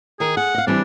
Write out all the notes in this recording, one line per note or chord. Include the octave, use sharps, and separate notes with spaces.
D#3 G#4 A#4
G#4 F#5
D#5 F5
E3 G3 C4 D4